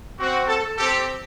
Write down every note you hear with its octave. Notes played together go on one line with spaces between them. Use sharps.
C4 F#4
A4
C4 G4 A4